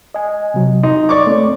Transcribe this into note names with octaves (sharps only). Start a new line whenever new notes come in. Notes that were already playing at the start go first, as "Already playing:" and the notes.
D#5 G#5
C3 F#3
D#4 C6
D5 C#6 D6
A3 C4 C#5